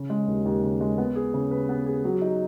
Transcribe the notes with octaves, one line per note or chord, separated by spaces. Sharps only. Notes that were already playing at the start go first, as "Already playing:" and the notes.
Already playing: C#3
G#3
D#2
D#2
C#3
G#3
B3
G#4
C#3
B4
B3
G#4
F#3
D#4